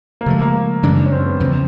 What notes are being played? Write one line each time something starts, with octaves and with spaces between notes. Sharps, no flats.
A#3
C#3 F3 G#3 A3
A#3
F#2 C#3 E3 G#3 D4
C#4
C4
B3
E2 C#3 F3 C4